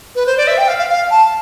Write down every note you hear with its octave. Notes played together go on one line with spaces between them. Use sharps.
B4
C5
D5
E5
G5
F5
F5
F5
A5